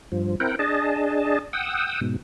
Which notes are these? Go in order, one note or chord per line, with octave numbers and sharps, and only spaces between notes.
G2 F3
C4 E4 A#4 F#5 G5
D4 G#4 D#5 A5
F#5 G5 D#6 E6
G#2 B2